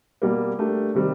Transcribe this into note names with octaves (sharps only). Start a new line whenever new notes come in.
B2 G3 A#3
A3 D4 G4 A#4
C3 D#3 G3 C4